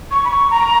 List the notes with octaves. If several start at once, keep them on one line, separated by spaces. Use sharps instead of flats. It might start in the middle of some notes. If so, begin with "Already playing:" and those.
C#6
B5
C#6
A#5